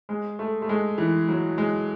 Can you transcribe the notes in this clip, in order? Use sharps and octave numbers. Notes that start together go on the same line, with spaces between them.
G#3
A3
A3
G#3
E3
F#3
G#3